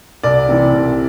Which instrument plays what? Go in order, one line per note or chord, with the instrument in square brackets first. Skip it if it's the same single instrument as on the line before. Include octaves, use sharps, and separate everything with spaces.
[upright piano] C2 D5
C3 E3
C2